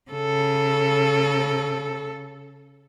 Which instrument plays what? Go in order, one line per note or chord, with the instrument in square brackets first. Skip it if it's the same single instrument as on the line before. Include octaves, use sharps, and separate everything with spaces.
[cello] C#3 A4